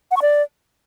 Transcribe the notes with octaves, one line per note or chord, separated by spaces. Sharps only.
F#5
C#6
D5